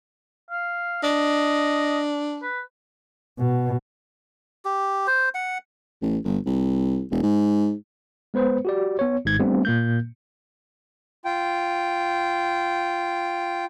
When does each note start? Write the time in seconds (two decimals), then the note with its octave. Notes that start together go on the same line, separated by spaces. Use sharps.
0.51 F5
1.03 D4 D#5
2.42 B4
3.39 B2
4.65 G4
5.07 C5
5.34 F#5
6.02 A1
6.24 G1
6.46 C2
7.11 E1
7.23 G#2
8.34 G#3 B3 B4 C5
8.65 F#4 G4 D5
8.99 B3 C#5
9.25 G#1 G#2 G#6
9.39 G3 A3 B3 C4 D4
9.65 A#2 A#3 G6
11.25 F4 G5